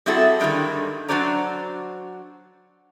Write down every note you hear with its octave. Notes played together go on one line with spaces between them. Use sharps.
G3 C4 E4 F#4 G#4 A4
G2 D3 D#3 G3 G#3
F#3 D4 F#4 C5 D5 A#5